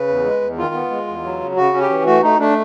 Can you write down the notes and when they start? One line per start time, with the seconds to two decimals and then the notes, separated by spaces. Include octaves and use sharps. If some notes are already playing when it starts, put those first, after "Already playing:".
Already playing: C#3 B4
0.08 E2
0.25 G#3
0.41 E2
0.58 D#3 F4
0.74 B3
0.91 G#3
1.07 E2
1.24 F#3
1.40 C#3
1.57 C#3 F#4
1.73 C#4
1.81 G4
1.90 E3
2.06 A3 F#4
2.23 A3 D#4
2.39 A3 D4